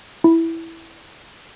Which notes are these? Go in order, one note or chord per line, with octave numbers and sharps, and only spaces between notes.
E4